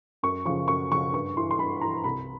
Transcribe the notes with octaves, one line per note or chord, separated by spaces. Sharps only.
F#2 C#6
C#3 F3 C#6
F#2 C#6
C#3 F3 C#6
G2 C#6
E3 C6
C6
G2 B5
E3 A#5
C2 B5